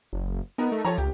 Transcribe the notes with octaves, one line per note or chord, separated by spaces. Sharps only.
F#1
B3 D#4 A#4
A3
F3 A4 C#5 A#5
C#2 G4